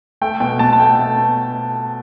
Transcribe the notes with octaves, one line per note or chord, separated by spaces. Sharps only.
A3 G5
B2 G5
B2 A5
A5
A3 G5
A3
B2